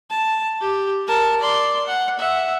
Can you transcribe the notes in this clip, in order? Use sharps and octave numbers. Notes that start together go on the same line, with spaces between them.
A5
G4
A#4 A5
D5 C6
F#5
E5 F#5